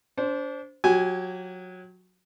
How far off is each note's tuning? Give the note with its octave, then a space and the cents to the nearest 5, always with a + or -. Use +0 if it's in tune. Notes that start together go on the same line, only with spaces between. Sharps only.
D4 -30 C5 +0
F#3 -20 G4 -35 G#5 +0